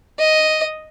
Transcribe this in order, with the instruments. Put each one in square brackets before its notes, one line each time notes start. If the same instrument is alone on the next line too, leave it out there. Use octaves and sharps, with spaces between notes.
[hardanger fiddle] D#5